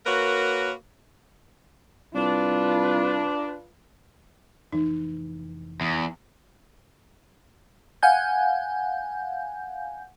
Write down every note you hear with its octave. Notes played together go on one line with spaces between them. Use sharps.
A#3 F#4 A#4 B4 C#5
C2 D4 F4 B4
F1 E3 D#4
E2
F5 F#5 G#5 G6